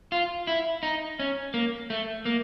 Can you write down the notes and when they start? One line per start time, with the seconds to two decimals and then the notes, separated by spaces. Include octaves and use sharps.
0.12 F4
0.47 E4
0.83 D#4
1.19 C#4
1.54 A#3
1.90 A3
2.25 A#3